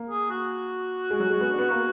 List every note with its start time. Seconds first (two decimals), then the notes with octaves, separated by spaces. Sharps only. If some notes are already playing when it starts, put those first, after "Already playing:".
Already playing: A#3
0.10 G#4
0.30 F#4
1.11 G#3
1.20 F#3
1.30 G#3
1.41 B3
1.50 D4
1.58 B3
1.70 A#3 F#4